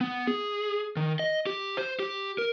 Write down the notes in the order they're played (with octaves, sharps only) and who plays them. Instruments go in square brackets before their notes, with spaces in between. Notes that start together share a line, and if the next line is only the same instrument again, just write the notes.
[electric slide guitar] B3
G#4
D#3
D#5
G4
C5
G4
A#4